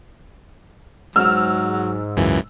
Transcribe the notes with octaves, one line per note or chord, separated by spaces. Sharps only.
G#2 F#3 E6 F6
C#2 F#2 E3